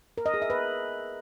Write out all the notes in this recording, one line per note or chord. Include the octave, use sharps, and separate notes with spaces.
A#4
D#5
G#4
E5
B4